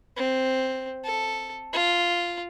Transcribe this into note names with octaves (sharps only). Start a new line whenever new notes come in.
C4
A4
F4